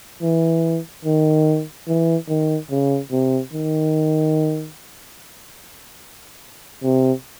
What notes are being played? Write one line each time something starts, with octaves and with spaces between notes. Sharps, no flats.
E3
D#3
E3
D#3
C#3
C3
D#3
C3